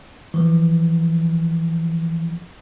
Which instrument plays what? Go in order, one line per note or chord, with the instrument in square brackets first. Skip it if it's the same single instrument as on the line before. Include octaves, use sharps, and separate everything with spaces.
[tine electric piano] E3 F3